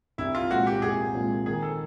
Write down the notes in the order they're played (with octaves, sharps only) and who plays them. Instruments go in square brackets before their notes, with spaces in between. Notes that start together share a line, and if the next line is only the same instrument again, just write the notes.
[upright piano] C2 [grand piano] E4
[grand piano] F4
[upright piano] A#2 F3 G#3 C4 [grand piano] F#4
[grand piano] G4
[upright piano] C2 [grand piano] G#4
[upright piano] A#2 F3 G#3 C4
[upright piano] D#3 [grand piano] G#4
[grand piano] A4